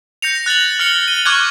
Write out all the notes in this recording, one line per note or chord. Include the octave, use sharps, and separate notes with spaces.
G6 A#6 C#7 F7
F#6 A6 A#6 F#7
F6 A6 C#7 G7
D#7 G7
C#6 D6 F6 F#6 G#6